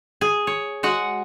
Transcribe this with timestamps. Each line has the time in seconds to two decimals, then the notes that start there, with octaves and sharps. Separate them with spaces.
0.21 G#4
0.47 C#5
0.83 G#3 F#4 F#5